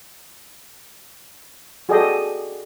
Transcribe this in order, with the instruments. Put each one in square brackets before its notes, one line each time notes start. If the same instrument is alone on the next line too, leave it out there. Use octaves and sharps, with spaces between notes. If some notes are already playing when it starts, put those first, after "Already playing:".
[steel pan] F#4 G#4 A4 D5 D#5 G5